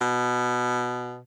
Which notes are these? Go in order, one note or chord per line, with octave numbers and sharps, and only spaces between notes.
B2